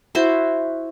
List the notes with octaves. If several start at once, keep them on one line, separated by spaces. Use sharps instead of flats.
E4 F#4 C5